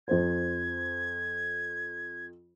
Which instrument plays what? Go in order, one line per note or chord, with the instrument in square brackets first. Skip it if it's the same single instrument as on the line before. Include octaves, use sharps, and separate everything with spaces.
[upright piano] F2 C5 [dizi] G#6